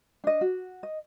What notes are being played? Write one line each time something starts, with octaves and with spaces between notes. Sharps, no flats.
D4 D#5
F#4
D#5